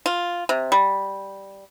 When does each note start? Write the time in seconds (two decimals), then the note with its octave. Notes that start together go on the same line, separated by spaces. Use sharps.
0.06 F4
0.49 C3
0.72 G3